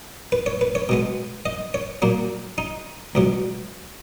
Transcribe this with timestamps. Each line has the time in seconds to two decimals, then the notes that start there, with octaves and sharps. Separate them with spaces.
0.32 B4
0.46 C#5
0.61 B4
0.75 C#5
0.89 B2 G#3 B3
1.46 D#5
1.74 C#5
2.02 A#2 F#3 A#3
2.58 D#4
3.15 C#2 B2 F#3